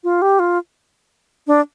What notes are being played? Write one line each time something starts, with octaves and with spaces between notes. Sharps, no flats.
F4
G4
F4
D4